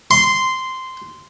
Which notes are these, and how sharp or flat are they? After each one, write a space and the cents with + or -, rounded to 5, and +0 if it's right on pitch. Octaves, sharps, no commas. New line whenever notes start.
C6 -10